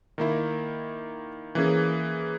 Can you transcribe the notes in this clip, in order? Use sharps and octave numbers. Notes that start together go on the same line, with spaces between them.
D#3 A#3 E4
E3 A#3 C#4 G#4